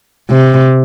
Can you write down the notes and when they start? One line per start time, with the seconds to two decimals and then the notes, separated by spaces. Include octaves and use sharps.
0.30 C3